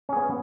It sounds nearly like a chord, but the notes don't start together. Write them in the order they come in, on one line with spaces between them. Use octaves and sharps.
C#4 G#4 B3